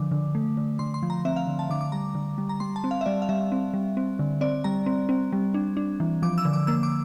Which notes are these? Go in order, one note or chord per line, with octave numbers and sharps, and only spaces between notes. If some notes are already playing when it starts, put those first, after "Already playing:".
Already playing: D3 F3 D6
D3
A3
D3
D3 C6
C6
F3
A#5
C4 E5
F5
D3
A5
D3 D6
D6
G3 A#5
D3
G3
A#5
G3 C6
A5
C4
F5
E5
G3 D5
F5
G3 E5
C4
G3
C4
D3
C4 D5
G3 A#5
C4
C4
G3
D4
D4
E3
F3 D6
E6
D3
D6
A#3 E6
D6